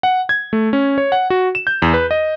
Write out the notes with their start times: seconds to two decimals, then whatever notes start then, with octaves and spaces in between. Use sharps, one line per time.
0.03 F#5
0.29 G#6
0.53 A3
0.73 C#4
0.98 C#5
1.12 F#5
1.30 F#4
1.55 E7
1.67 G6
1.82 E2
1.94 B4
2.11 D#5